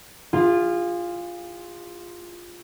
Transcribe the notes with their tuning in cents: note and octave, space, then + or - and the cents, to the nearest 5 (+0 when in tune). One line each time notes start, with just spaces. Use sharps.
F4 +0 G#4 -35